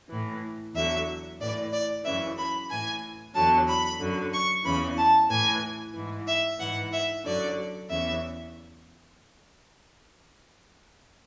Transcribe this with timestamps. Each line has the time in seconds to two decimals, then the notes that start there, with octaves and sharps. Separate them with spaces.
0.10 A2 E3
0.74 E2 D3 F#3 E5
1.39 A2 E3 D5
1.72 D5
2.04 F#2 C#3 E3 E5
2.37 B5
2.69 A2 E3 G#5
3.34 E2 D3 F#3 A5
3.68 B5
3.99 F#2 D3 F#3
4.33 C#6
4.64 E2 C#3 E3 B5
4.97 A5
5.30 A2 E3 G#5
5.94 G#2 E3
6.27 E5
6.59 G#2 E3 F#5
6.92 E5
7.24 F#2 D3 F#3 D5
7.89 E2 C#3 E3 E5